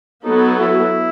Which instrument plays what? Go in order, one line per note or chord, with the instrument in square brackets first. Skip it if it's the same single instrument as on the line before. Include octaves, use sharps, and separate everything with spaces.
[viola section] F#3 B3 F#4 A4 [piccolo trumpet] D#4
[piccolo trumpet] E4